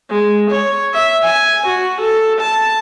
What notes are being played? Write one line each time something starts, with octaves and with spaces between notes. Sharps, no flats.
G#3
C#5
E5
G#5
F#4
A4
A5